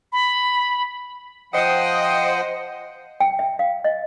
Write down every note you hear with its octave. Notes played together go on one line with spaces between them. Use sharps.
B5
F3 C5 D#5 F#5 G5
G5
E5
F5
D#5